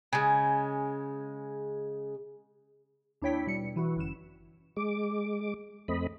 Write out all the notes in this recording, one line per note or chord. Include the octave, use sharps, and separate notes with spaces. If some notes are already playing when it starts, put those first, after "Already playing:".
C#3 G#3
D#2 D4 E4 C#5 G5 B6
B2 G3 C#7
E3 E4 F#4
G1 F#2 E7
G#3 D6
F2 A3 C4 D#5 B5